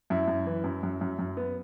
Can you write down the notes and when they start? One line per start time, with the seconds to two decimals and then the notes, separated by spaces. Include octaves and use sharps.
0.10 F#2 E4
0.28 F#2
0.47 E3
0.64 F#2
0.83 F#2
1.01 F#2
1.19 F#2
1.37 B3